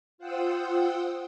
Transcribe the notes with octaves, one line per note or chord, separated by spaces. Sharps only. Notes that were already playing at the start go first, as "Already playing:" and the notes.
F4 C5 F#5 G5 D#6 E6